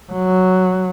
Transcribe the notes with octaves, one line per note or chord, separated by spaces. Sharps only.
F#3